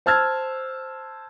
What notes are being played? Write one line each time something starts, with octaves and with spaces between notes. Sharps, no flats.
C5 A5 E6 F6 G#6